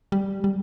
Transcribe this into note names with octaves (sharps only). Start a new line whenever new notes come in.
G3
G3